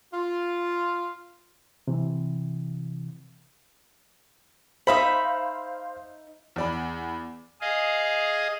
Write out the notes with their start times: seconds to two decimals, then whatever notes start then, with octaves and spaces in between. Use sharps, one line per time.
0.12 F4
1.87 C3 E3
4.87 D#4 C5 E5 F5 B5
6.56 E2 D5 B5
7.61 G#4 D#5 F5